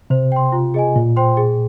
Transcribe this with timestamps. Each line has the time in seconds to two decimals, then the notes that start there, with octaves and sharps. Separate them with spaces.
0.10 C3 C5
0.32 G5 C6
0.52 F4
0.74 G#4 D#5 G#5
0.96 A#2 F4
1.16 C5 G5 C6
1.37 G#4